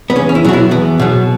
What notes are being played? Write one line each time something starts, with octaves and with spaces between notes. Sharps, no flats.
B3
E2 C#4
C#4
E4
B2 F#3 F#4
E4
E2 B3
B2 F#3